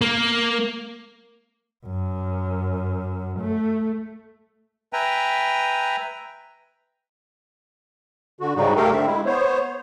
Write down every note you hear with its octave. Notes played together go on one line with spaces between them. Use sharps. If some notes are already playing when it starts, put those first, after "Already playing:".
A#3
F#2
A3
B4 E5 G5 G#5 A#5
D3 F#4
G#2 C#3 G3 D#4 F#4
A3 G4 A4 A#4 F5 G5
D3 C4 E5
G#3 E4
B3 C5 C#5